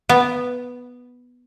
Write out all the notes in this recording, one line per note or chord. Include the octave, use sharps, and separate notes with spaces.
B3